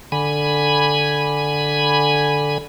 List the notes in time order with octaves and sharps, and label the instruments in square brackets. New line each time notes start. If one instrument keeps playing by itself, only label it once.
[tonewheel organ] D3 G#5 B5